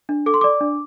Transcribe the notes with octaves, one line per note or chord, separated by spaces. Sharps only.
D4
A4 D6
C6
D5 D6
D4